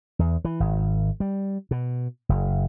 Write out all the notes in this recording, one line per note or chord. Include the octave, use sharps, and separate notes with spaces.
E2
E3
G#1
G3
B2
F#1